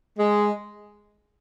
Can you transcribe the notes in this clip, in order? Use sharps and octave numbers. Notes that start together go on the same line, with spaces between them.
G#3